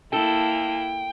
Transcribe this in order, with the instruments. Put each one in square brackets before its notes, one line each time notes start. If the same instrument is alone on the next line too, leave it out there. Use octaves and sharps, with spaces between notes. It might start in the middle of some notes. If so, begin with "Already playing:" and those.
[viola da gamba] A#3 E4 [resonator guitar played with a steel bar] A4 [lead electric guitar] G5